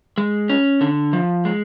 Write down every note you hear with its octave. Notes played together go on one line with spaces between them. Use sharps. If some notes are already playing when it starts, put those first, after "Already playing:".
G#3
C#4
D3
F3
G#3